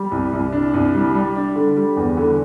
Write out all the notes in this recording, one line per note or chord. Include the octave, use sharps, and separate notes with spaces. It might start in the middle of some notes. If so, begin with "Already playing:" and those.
Already playing: G3
C2
C2
D4
C2
G3
G3
D4
D3
G3
E2
D3